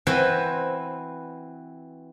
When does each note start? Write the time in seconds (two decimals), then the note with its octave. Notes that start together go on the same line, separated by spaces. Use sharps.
0.07 E3 C4 F#4 B4 C5